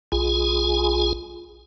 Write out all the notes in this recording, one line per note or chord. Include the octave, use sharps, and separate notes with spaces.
B1 F4 G#4 G#5